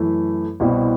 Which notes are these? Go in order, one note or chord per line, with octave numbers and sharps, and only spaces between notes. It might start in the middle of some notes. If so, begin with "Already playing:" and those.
Already playing: F#2 E3 A3 E4
C2 B2 G3 C4 E4